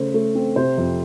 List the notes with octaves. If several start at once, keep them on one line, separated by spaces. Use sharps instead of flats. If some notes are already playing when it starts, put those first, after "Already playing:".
Already playing: C#3 A3 C5
A3
C4
C3 C5
F2